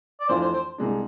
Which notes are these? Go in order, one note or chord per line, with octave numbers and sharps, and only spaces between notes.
D5
F2 E3 A3 D4 F4 C5
C5
C5
C2 C3 G#3 D4